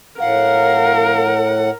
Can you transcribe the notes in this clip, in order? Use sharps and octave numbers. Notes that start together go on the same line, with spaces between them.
A2 A#4 F5 F#5